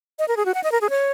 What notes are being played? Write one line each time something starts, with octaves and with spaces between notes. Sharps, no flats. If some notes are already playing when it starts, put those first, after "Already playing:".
D#5
A#4
G#4
F#4
F#5
D#5
A#4
G#4
C#5